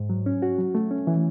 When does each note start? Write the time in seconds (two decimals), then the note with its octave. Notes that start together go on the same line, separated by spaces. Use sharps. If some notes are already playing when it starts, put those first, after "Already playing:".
Already playing: G#2
0.10 F#3
0.26 C#4
0.42 F#4
0.58 F#3
0.75 A3
0.91 C#4
1.07 E3